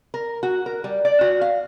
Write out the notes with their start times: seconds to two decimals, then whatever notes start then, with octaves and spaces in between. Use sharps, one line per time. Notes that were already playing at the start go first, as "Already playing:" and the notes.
0.14 A#4
0.43 F#4
0.66 A#4
0.84 G3
1.05 D5
1.21 F#4
1.41 F5